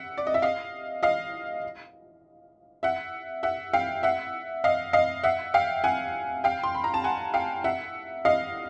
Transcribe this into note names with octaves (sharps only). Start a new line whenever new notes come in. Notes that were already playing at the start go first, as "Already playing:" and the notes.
Already playing: E5 F#5
D5
D#5
E5
D#5 F5
D#5 F5
E5 F#5
E5 F#5
F5 G5
E5 F#5
D#5 F5
D#5 F5
E5 F#5
F5 G5
F#5 G#5
F5 G5
C6
B5
A#5
A5
F#5 G#5
F5 G5
E5 F#5
D#5 F5